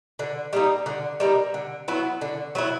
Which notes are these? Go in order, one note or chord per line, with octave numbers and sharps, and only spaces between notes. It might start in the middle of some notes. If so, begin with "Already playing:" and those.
D3
G3 A#3 D#4
D3
G3 A#3 D#4
D3
F#3 B3 E4
D3
F#3 B3 E4